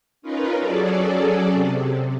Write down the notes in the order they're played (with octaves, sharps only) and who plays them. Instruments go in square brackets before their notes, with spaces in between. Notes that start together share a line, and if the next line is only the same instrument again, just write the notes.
[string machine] C#4 D#4 F4 A#4 B4
F#3 C#4 G#4 A4 D5
C3